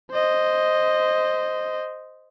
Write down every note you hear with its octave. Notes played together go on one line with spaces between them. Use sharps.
C5 D#5